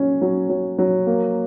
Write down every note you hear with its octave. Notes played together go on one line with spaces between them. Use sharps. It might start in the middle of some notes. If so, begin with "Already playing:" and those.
Already playing: F#3 C#4
F#3
F#3
F#3
A#3